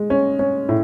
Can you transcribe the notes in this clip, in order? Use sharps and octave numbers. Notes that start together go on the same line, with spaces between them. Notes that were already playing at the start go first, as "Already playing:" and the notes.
Already playing: G#3
C#4
C#4
A2